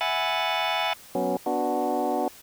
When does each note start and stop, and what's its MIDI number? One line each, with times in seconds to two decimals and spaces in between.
0.01 0.93 76
0.01 0.93 78
0.01 0.93 80
0.01 0.93 83
0.01 0.93 90
0.01 0.93 93
1.15 1.36 54
1.15 1.36 59
1.15 1.36 61
1.46 2.28 59
1.46 2.28 62
1.46 2.28 66